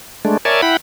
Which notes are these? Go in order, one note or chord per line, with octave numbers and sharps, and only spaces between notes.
G#3 A3 D4
A#4 C#5 D5 E5 G#5 A5
E4 F#5 G5 B5